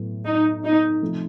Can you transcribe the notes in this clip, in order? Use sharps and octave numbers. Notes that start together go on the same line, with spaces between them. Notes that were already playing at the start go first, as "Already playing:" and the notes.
Already playing: A2 F#3 B3
D#4
D#4
C3 F3 A3